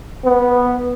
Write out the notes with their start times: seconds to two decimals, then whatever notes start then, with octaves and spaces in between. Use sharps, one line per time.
0.25 B3